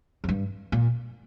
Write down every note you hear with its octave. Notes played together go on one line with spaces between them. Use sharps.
F2
G2
A#2